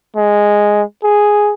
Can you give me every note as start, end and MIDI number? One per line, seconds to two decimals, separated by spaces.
0.17 0.83 56
1.04 1.53 68